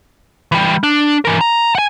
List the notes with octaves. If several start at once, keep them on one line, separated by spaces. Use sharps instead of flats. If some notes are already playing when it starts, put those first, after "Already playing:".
E3 G3
D4
E3 A#4
A#5
F#5 G#5